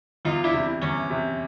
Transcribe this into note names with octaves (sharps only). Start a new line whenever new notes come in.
E2 D#4 F4
D4 E4
C3
E2 C#4
C3